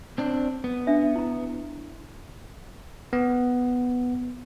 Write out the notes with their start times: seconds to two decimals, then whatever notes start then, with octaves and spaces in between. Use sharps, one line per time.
0.18 C4 D4
0.64 B3
0.87 D4 E5
1.16 E4 A#5
3.13 B3